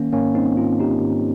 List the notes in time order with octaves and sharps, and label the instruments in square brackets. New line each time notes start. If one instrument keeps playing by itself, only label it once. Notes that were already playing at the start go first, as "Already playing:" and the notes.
Already playing: [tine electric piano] D#3 A#3 C#4
G#2 A#3 C#4
G3 C4 D#4
G#2 C#4 F4
D#3 D#4 G4
G#2